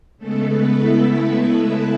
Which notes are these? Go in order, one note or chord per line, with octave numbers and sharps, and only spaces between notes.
C#3 G#3 A3 B3 A4
B3 B4
E4 E5
E4 E5